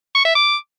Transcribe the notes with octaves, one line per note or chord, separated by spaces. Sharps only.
C#6
E5
D6